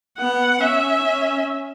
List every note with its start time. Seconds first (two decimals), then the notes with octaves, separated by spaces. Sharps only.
0.19 B3 F#5
0.60 C#4 E5
1.03 C#4